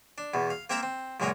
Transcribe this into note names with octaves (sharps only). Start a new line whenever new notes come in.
D4
E2 B2
F5
A#3 C4 A#4 E5 A5 A#5
C4
C#2 F#2 A#2 F#3 G#3 A#4